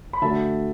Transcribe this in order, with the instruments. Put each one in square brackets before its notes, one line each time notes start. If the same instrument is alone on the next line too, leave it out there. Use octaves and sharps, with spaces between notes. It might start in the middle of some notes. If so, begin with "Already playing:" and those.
[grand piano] B5
[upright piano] D3 A3 F#4 [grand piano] E5 A5